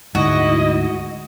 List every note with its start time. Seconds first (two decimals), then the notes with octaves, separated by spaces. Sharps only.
0.15 D2 G#2 E4 F#4 D#5